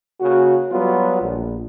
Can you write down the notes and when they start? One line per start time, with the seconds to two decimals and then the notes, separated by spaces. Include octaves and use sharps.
0.21 C#3 A#3 F#4
0.70 F#3 G3 B3 F4 F#4
1.21 A#1